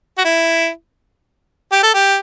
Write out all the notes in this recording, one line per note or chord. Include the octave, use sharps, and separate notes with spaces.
F#4
E4
G4
A4
G4